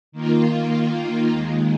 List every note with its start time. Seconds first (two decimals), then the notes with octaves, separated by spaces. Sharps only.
0.12 D#3 A#3 F4
1.30 D#2 D#3 G#3